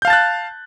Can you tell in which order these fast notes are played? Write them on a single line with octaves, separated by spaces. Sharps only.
G6 F5 A5 A6 F#6